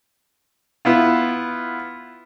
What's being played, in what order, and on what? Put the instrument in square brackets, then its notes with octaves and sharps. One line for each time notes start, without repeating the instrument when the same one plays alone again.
[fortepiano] B3 E4 F4